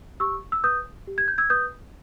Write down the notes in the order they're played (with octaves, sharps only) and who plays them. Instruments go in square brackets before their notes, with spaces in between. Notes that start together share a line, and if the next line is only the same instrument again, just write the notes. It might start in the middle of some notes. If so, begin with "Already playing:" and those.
[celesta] G4 C#6 E6
E6
B4 D#6 G6
G4
G#6
G6
E6 G#6
B4 D#6 G6